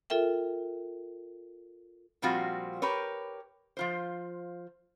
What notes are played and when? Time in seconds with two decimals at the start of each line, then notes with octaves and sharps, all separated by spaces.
0.10 F4 A4 A#4 E5 G5
2.22 A#2 F3 G3 C4 F4 F#4
2.82 G4 A#4 B4 C#5
3.77 F3 F4 C5